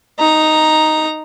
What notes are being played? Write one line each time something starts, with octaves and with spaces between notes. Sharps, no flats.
D#4 A#5